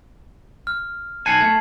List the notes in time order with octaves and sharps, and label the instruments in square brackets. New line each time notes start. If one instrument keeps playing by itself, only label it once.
[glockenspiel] F6
[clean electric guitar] B1 F#5 G#5 [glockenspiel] A5 C7 F#7
[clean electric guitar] A3 [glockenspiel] G#6